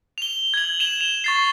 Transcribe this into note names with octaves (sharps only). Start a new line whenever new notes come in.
F7 G7
G#6 F#7
E7 F7 G7
F7
C#6 A6 C7